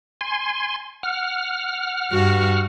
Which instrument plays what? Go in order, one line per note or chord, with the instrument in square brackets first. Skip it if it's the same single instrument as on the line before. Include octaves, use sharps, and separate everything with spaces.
[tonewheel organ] G#5 C6
F#5 F6
[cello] G2 F#4